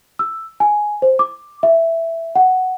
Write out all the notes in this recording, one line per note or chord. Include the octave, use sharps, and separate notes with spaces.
E6
G#5
C5
D6
E5
F#5